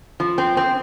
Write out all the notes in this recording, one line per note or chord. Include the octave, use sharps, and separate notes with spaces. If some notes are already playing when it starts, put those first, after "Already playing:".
F3
C4
C4